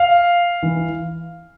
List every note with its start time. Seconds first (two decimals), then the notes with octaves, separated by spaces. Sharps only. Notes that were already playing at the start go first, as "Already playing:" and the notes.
Already playing: F5
0.63 E3